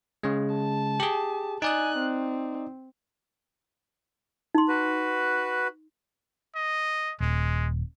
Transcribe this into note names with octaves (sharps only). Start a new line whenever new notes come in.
C#3 G#3
A5
G4 G#4
D#4 D5 G#5 D#6 F#6
C4
D#4 C6
F#4 B4
D#5
D#1 G#3